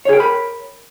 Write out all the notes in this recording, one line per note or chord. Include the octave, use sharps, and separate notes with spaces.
G#4 A#4 C#5 G5 B5